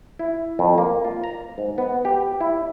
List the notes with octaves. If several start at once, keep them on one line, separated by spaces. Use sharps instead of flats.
E4
F2
A#3
F4
A#5
G#2
B3
G4
E4